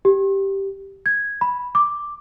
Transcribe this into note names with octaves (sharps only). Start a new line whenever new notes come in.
G4
G#6
B5
D6